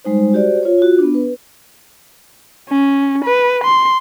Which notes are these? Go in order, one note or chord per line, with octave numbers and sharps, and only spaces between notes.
G3 G#3 D#4 C5
F#4 G4 C5 D5
F4 C#5
F4 F#4
B3 D4
B4
C#4
B4
C6